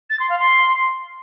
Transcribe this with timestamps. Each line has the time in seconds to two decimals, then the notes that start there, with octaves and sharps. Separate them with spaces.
0.10 A6
0.20 C6
0.29 F5
0.39 C6